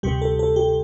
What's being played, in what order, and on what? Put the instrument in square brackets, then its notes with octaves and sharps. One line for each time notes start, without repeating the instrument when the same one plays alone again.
[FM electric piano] D2 C3 G3 G4
A4
A4
G4